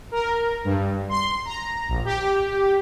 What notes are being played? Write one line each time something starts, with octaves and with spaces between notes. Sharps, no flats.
A#4
G2
C6
A#5
A#1
G4